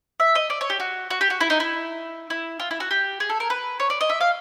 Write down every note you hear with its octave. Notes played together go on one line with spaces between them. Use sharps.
E5
D#5
D5
C#5
G4
F#4
F#4
G4
F#4
E4
D#4
E4
E4
F4
E4
F#4
G4
G#4
A4
A#4
B4
C#5
D5
D#5
E5
F5